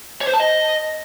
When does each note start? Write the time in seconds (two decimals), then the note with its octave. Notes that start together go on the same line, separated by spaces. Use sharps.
0.21 C#5
0.27 C5
0.34 A5
0.40 D#5